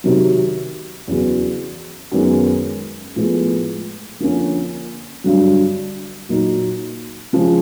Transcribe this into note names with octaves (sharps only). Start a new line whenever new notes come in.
C3 D#3 F#3
E2 C#3 F#3 B3
F#2 D#3 G#3 B3
A2 F3 G#3 B3
D3 F3 A#3 C#4
G2 D3 F#3
A#2 F#3 A#3 D#4
C#3 F3 G#3